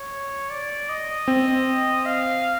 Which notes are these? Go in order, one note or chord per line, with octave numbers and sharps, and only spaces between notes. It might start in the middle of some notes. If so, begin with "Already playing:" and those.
Already playing: C#5
D5
D#5
C4
F5